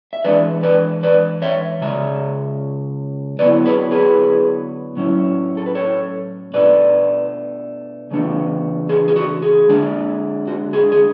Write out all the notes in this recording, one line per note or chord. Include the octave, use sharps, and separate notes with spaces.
E5
E3 G#3 D4 B4 D5
B4 D5
B4 D5
C#5 E5
C#3 G#3 E5
D3 F#3 B3 E4 B4 D5
G#4 B4
G#4 B4
A2 F#3 C#4 E4
A4
B4
A4 C#5
B2 A3 D4 B4 D5
C#3 E3 A3 D4
G#4
G#4
F#4 A4
G#4
D3 G#3 D4
F#4
G#4
G#4